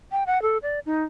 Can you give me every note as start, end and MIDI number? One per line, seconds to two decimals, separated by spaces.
0.12 0.24 79
0.27 0.41 78
0.42 0.58 69
0.63 0.80 74
0.86 1.03 63